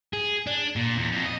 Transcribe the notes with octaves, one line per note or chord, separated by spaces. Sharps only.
G#4
D4
A#2
E2
F2
D#5